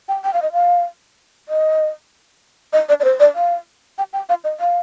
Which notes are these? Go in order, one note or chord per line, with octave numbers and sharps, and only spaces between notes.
G5
G5
F5
D#5
F5
D#5
D#5
D5
D5
C5
D5
F5
G5
G5
F5
D#5
F5